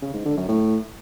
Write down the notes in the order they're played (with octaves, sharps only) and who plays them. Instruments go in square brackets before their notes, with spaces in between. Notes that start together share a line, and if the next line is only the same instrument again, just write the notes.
[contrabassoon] C#3
G#2
D3
F#2
A2